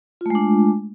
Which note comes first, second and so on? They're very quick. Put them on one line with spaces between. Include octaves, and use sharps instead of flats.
F4 A3 G#3 D4